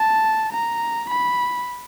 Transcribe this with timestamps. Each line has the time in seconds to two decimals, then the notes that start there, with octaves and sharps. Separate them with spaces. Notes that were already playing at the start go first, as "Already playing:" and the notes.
Already playing: A5
0.52 A#5
1.10 B5